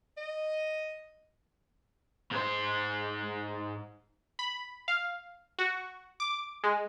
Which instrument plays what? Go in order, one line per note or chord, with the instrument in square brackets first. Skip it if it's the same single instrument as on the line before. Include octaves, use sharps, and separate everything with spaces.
[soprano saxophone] D#5
[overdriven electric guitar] G#2 C5
[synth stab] B5
F5
F#4
D6
G#3